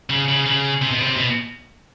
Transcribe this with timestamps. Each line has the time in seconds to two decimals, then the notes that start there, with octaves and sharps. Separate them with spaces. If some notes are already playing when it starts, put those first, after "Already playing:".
0.10 C#3
0.29 C#3
0.46 C#3
0.82 C3
0.91 B2
1.01 C3
1.17 B2